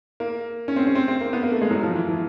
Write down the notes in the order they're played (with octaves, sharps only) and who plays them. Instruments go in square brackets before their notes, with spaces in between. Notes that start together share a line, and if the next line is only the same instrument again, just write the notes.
[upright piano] A#3
C#4
C4
C#4
C4
C4
A#3
B3
A#3
A3
G#3
F#3
F3
E3
E3